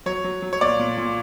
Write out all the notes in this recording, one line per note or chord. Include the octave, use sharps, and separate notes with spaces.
F#3 C#5
F#3
F#3
C#5
A#2 D5
A#2
A#2